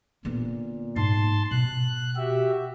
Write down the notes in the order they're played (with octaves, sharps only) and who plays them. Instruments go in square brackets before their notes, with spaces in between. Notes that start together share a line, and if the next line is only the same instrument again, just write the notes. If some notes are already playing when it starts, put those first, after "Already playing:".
[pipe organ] A#2 [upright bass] D3 B3
[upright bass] G#2 [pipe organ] A5 C6
[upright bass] B2 [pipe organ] F#6
[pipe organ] F#4 G4 E5